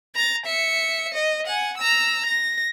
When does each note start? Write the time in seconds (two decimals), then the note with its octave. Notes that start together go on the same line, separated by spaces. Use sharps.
0.15 A#5 A6
0.46 E5 C#7
1.14 D#5
1.46 F#5 G#5
1.77 A#5 E6
2.26 A#6